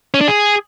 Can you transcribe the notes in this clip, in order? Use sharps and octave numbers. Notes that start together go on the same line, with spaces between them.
C#4
D4
G#4